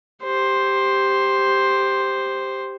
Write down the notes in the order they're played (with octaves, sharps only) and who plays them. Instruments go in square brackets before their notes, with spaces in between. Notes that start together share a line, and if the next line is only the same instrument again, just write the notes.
[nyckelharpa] G4 C5